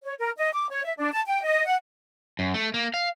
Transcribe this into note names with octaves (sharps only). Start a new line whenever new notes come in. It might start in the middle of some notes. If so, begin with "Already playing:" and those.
C#5
A#4
D#5
D6
C#5
E5
D4
A5
G5
D#5
F#5
F#2
A3
A#3
F5